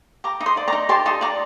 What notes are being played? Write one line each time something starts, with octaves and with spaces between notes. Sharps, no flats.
G4 A#5 D6
D#4
C6 D#6
D5
A#5 D6
D#4
G4 A5 C6
D#4 A5 C6
D5 A#5 D6